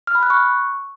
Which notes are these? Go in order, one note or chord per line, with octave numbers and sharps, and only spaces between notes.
F6
B5
F#6
C#6